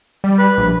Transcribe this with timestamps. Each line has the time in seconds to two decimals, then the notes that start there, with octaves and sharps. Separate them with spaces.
0.24 G3
0.38 B4
0.58 A#1